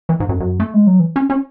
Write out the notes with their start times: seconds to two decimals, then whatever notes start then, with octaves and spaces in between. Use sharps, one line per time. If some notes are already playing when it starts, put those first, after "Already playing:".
0.09 E3
0.20 G#2
0.29 F#2
0.40 F#2
0.60 A3
0.74 G#3
0.87 F#3
1.00 E3
1.16 C#4
1.30 C#4